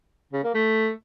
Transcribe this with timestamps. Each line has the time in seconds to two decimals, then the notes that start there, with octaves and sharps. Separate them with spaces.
0.33 C#3
0.44 A#3
0.54 A3